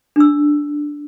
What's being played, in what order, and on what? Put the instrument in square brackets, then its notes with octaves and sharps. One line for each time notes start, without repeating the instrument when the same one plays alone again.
[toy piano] D4 E6